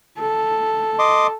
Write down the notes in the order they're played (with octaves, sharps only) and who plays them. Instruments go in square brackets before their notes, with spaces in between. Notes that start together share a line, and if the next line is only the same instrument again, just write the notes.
[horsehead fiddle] A4
[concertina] D#5 C6 D6